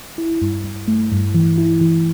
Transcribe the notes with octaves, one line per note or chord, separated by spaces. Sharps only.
E4
G2
G2
A3
G2
E3
E4
E3